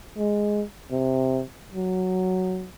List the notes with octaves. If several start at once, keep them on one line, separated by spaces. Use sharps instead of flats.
G#3
C3
F#3